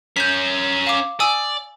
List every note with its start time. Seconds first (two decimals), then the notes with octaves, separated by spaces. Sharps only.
0.16 C#4 A#4 G6 B6
0.87 F5 D6
1.20 D5 G#5 D#6 E6